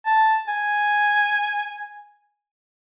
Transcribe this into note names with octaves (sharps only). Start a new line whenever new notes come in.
A5
G#5